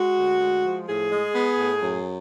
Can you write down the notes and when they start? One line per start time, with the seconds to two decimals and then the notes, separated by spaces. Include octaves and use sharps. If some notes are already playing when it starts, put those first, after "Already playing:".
Already playing: G#3 F#4
0.16 D2
0.40 G#3
0.64 F3
0.88 A2 G#4
1.12 G#3
1.35 B3
1.59 A2
1.82 F#2